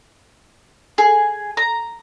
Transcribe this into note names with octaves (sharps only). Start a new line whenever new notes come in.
G#4
A#5